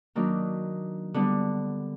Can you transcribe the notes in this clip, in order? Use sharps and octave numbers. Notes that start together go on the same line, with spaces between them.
D#3 F#3 A#3 D4
D3 G3 B3 D4